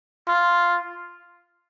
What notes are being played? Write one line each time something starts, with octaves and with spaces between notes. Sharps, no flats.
F4